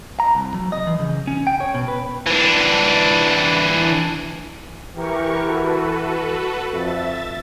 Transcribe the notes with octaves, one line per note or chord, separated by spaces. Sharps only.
A#5
C2
F#3
D#5
E3
C#3
C#4
G5
C#5
B2
B4
E3 D4
E3 G4 A#4 C#6
F#4 A4 B4
F2 E5 A6